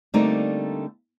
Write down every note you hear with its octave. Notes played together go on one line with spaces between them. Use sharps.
D3 G3 A3 A#3 C4 D#4